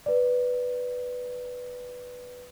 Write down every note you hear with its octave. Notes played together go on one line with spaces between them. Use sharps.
B4 D5